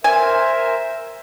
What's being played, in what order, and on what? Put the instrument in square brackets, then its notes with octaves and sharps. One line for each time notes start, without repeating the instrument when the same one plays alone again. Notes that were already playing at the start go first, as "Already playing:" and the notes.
[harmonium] A#4 C5 E5 [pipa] G#5